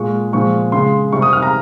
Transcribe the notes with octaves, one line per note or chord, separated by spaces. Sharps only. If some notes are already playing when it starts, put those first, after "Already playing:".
Already playing: A#2 G#3 C#6
A#2 F3 G#3 C#6
C#3 G#3 C6
C3 G3 C#6
D#6
F6
A#5